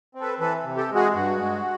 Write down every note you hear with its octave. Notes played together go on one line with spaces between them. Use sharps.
C4
A4 B4
E3 A4 B4
C3
G4 A4
G#3
F#4 G#4
G2 F#4
G#3